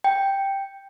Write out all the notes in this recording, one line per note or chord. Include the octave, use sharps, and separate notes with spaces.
G5